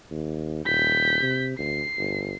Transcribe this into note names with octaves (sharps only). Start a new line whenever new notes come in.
D#2
D#1 G6 B6
C3
D2 C7
G1